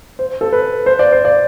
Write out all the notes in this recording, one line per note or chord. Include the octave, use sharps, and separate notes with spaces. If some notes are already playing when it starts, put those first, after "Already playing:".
C5
A4
B4
C5
D5
C5
D5